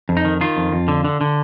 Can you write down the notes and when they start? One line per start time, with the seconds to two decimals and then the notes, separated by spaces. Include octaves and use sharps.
0.09 F2
0.17 D#4
0.25 D#3
0.41 D#3 F4
0.57 F2
0.72 F2
0.88 D3
1.05 D3
1.21 D3